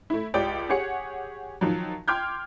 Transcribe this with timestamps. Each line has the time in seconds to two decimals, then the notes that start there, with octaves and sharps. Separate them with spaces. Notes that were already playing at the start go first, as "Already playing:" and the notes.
0.10 A3 E4
0.34 C#2 G4 D5 G5
0.69 G4 G#4 C#5 F#5 C#7
1.61 D#3 F3 F#3
2.08 G5 C6 D6 F6 G6 G#6